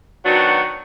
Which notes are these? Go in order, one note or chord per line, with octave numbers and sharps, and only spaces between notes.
D#3 F#3 B3 D4 F#4